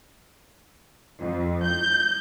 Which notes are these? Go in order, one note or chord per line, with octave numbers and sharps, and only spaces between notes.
F2
G6